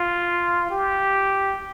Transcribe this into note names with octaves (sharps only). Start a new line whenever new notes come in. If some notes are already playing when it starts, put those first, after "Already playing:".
Already playing: F4
G4